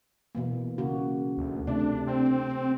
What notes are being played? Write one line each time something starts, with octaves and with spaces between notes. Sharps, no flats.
B2 E3 A#3
C#3 A#3 F#4
D2
C3 A3 D4
C4